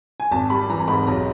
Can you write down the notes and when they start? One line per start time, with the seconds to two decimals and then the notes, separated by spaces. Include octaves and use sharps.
0.20 G#5
0.31 G#1 A5
0.50 G3 B5
0.69 E3 A#5
0.80 A#5
0.88 G#2 B5
1.07 B1 A#5